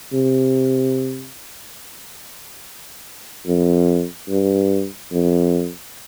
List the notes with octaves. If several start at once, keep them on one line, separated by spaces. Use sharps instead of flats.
C3
F2
G2
F2